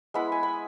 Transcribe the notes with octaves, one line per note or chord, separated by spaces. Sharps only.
G#3 B3 E4 F#5 B5
G#5
B5